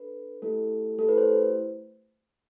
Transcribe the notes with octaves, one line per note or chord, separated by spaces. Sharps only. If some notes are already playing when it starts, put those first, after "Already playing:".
Already playing: D4 A4 B4
A3 E4 G4 A4
A3 E4 G4 A4
B4
C5